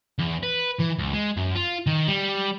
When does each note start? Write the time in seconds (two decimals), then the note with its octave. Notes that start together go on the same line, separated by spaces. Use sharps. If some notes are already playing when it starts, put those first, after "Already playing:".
0.19 E2
0.43 B4
0.79 E3
0.98 C#2
1.13 G#3
1.37 F#2
1.55 F4
1.87 D#3
2.08 G3